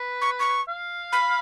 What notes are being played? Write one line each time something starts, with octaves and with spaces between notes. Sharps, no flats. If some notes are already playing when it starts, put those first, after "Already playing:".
Already playing: B4
C#6
C#6
F5
B5